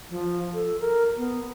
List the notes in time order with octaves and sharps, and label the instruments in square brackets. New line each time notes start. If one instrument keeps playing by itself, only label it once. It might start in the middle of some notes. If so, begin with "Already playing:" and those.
[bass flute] F3
A4
A#4
B3